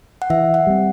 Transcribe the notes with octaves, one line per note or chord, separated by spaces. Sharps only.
F#5
E3 E5
F#5
G3 C4